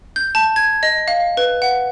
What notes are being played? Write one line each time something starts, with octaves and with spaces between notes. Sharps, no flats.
G6
A5
G#6
D#5
F5
B4
F#5